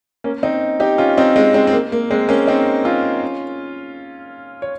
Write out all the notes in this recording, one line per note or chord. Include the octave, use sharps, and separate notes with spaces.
A#3 C#4
C4 D#4
D#4 G4
C#4 F4
C4 D#4
G#3 C4
G#3 C4
C4
A#3
A#3
G#3 C4
A#3 C#4
C4 D#4
C#4 F4
C#5